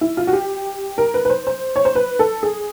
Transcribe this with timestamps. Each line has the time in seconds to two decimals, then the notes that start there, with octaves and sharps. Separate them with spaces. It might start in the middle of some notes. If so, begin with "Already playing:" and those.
0.01 E4
0.17 F4
0.27 F#4
0.33 G4
0.98 A#4
1.14 B4
1.25 B4
1.30 C5
1.47 C5
1.76 C#5
1.85 C5
1.95 B4
2.19 A4
2.43 G#4